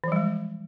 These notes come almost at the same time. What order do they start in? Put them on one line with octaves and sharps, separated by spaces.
E3 F3 G3 G#3